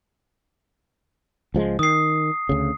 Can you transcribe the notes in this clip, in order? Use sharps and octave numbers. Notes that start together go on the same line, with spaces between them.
C#2 F3 G#3
D#3 D#6 C7
D2 C#3